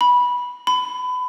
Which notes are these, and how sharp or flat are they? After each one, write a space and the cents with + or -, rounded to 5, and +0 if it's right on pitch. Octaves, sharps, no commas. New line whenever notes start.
B5 -15
B5 +25